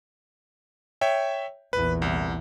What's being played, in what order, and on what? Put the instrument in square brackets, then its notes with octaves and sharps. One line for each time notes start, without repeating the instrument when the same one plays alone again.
[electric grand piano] C#5 E5 G5
[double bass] A#1 E2 [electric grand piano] B4
[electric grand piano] C2